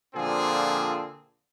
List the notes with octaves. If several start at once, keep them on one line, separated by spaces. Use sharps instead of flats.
A#2 D3 F3 C4 G#4